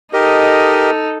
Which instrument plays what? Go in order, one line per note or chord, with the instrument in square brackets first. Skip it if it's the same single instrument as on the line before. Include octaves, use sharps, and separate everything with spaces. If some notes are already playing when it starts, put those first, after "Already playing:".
[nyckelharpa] D#4 A4 [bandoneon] G4 A#4 D#5